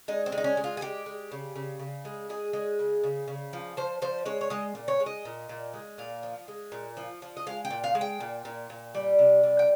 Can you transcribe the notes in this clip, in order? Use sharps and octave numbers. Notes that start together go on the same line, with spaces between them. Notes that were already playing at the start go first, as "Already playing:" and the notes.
G#3 D#4
C4
G#3
D#4
C#4
G#3
F4
G#4
G#3 G4
G#3
C#3
C#3
C#3
G#3
G#3 G#4
G#3
C#3
C#3
C#3
F3
F3 C5
F3 C5
G#3 C#5
C#5
G#3 D#5
A#2
C#5
G#3
D#5
A#2
A#2
G#3
A#2 F5
F3
G#3
A#2
F3
F3
D#5
G#3 F5
G5
A#2
F5
G#3
G5
A#2
A#2
A#2
G3
C3
G3
G5